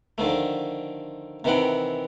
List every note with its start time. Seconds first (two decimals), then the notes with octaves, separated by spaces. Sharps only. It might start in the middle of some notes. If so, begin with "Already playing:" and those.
0.18 D3 D#3 F3 A3
1.44 C3 D#3 E3 C5 F#5 G5